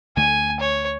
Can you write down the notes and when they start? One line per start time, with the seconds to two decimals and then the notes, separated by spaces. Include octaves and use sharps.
0.17 D2 D3 A3 G#5
0.60 C#5